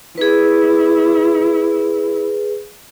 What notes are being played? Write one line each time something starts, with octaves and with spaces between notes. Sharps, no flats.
E4 G#4 B4